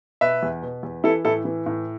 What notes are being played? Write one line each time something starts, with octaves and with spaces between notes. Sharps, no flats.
B2 B4 E5
E2
B2
E2
E3 E4 A4
A2 E4 A4
E3
A2